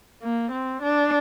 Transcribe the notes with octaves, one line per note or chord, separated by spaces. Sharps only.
A#3
C4
D4